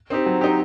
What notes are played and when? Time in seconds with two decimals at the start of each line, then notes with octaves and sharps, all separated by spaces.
0.10 C4 D#4 G4
0.26 F#3
0.41 C4 D#4 G4